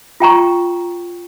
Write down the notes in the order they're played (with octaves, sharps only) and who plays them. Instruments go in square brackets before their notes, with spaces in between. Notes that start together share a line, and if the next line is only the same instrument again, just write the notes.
[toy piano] F4 G5 A#5 C#6